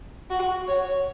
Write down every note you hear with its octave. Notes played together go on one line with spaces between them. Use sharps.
F#4
C#5